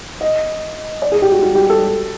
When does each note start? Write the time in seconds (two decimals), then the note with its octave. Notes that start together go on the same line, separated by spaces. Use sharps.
0.21 D#5
1.02 D5
1.12 G#4
1.22 G4
1.32 F#4
1.42 F#4
1.55 G4
1.70 A4